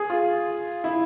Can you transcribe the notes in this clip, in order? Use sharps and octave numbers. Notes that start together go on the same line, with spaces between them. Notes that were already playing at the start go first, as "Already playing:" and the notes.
Already playing: G#4
F4
E4